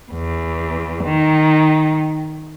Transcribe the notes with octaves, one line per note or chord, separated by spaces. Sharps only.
E2
D#3